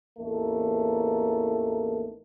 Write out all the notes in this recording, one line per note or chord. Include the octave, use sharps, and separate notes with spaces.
A1 E2 A3 A#3 D#4